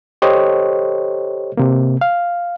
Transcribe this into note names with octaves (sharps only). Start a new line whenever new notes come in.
G4 A4 C5 C#5 D#5
C3 A#3
F5